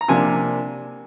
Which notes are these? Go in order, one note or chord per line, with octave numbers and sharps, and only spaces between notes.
A#5
C3 F3 A#3 D4 G#5